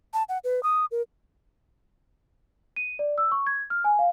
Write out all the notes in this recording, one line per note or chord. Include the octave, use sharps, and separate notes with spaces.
A5
F#5
B4
D#6
A#4
D#7
D5
E6
C#6
G#6
F6
G#5
F5